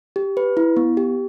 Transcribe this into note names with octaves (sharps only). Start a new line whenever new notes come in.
G4
B4
E4
B3
G4